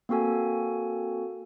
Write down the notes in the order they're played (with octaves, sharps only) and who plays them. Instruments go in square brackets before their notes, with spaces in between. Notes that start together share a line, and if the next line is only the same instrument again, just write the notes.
[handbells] A#3 C4 F#4 A4 G#5